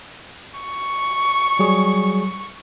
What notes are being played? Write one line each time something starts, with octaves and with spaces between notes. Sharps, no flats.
C#6
F#3 G3 G#4